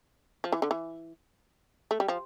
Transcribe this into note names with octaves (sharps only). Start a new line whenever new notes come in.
F3
E3
D3
E3
A3
G3
F3